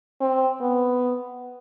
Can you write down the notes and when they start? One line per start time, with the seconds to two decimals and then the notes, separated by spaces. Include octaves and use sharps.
0.21 C4
0.61 B3